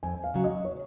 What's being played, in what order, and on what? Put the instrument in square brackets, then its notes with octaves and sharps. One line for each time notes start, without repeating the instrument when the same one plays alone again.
[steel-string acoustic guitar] F2 [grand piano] G#5
[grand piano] F5
[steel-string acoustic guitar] C#3 F#3
[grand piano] D#5
C#5